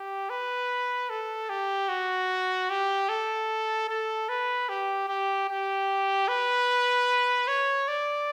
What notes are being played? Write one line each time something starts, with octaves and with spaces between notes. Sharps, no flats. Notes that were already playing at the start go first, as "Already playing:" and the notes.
Already playing: G4
B4
A4
G4
F#4
G4
A4
A4
B4
G4
G4
G4
B4
C#5
D5